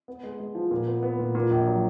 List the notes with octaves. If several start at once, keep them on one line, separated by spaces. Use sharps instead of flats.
B3
G#3
G#3
F3
A#2
B3
B3
A#2
A#2
A#1
F#3